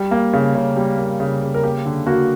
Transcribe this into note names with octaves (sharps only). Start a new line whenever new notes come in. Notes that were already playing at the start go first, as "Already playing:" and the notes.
Already playing: G3
A#3
C#3
C#3
G3
A#3
C#3
C#3
A#4
A#3 G4
D3
A#3 F#4